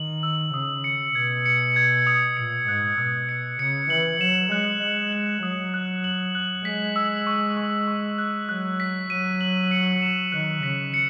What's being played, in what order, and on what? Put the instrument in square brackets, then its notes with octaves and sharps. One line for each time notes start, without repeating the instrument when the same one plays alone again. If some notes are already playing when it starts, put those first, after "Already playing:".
Already playing: [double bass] D#3 [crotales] F#7
[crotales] E6
[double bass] C#3 [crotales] D#6
[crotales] C#7
[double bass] B2 [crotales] G#6
[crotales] C#7
G#6
D#6
[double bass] A#2 [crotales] C#7
[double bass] G#2 [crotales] F#6
[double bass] B2 [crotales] D#6
[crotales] C#7
[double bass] C#3 [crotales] C#7
[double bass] E3 [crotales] F#7
[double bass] F#3 [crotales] E7
[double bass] G#3 [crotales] F#6
[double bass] G#3 [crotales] F#7
[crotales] F#7
[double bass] F#3 [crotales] D#6
[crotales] F#6
F#7
F#6
[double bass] G#3 [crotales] B6
[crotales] E6
C#6
C#6
C#6
F#6
[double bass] F#3 [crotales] F#6
[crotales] B6
[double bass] F#3 [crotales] D#7
[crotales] F#7
C#7
E7
[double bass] D#3 [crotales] F#6
[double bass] C#3 [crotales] B6
[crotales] C#7